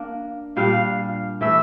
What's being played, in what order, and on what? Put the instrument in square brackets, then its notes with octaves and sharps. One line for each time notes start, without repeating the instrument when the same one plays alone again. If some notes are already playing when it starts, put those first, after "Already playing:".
Already playing: [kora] A#3 D4 A#4
[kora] A#2 G3 D4 [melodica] F5
[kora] E3 A3 E4 [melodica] E5